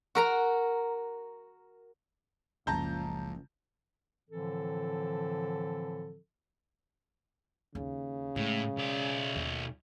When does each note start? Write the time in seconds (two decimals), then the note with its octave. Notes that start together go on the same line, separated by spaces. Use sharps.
0.15 F#4 A#4 A#5
2.67 F#1 C#2 F3 A5 A#5 G6
4.30 A2 D3 E3 F3 C4 A4
7.75 D#2 C#3
8.36 A2 G#3
8.77 B1 D5
9.36 D#2